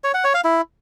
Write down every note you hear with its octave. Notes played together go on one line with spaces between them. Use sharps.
C#5
F#5
C#5
F5
E4